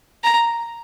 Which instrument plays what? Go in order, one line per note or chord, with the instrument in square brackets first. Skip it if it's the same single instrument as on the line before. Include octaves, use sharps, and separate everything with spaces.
[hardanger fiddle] A#5